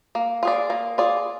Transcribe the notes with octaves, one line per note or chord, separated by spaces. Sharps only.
A#3
F4 G#4 D5
A#3
F4 G#4 D5